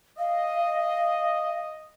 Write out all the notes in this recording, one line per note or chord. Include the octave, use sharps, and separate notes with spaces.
D#5 F5